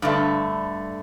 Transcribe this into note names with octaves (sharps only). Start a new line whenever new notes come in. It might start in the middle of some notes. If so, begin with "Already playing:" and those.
G2 D3 A3